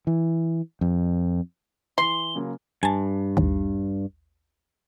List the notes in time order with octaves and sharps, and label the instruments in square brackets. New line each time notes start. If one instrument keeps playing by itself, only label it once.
[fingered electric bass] E3
F2
[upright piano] E3 [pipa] C6 [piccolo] G7
[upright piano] C#3 F#3 A#3
[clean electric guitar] G2 [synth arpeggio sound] G#5 A5
[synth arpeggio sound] A1 D#2